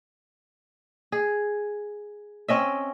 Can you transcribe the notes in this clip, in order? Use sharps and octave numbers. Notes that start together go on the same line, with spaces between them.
G#4
C4 C#4 D#5 E5